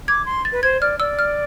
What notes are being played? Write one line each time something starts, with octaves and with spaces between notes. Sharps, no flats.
D6 G#6
C6
A6
B4
C5 G#6
D5 F6
D5 E6
F6